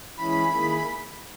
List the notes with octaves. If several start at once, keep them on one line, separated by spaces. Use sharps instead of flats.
E3 G#3 C#4 E4 G#4 B5
D#3 A#3 E4 G#4
B5